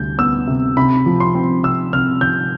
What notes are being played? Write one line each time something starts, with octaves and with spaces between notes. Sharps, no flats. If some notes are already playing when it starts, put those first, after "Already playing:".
Already playing: D2 C3 G3 G6
B3 E6
C3
C3 B5
F3
C6
C4
C3 E6
C3 F6
F3 G6